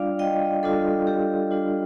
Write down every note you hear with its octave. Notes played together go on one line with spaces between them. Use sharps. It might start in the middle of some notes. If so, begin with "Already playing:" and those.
Already playing: G3 D4 F4 D5 F5
D#5 G5
G3 D4 F4 A4
G4
G3 D4 F4